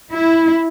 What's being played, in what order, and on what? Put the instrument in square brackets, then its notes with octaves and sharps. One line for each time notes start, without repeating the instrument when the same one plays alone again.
[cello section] E4